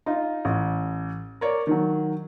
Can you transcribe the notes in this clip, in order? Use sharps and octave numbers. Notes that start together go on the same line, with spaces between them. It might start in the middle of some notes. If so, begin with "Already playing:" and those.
D#4 F4
A1
A#4 C#5 D5
D#3 F#3